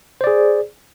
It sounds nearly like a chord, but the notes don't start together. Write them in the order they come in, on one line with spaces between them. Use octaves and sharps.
C5 D5 G#4